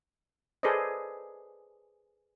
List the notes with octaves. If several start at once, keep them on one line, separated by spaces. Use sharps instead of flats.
G#4 A4 B4 C5 D5 D#5